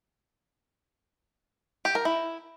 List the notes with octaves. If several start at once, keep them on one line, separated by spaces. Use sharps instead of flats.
G4
A#4
E4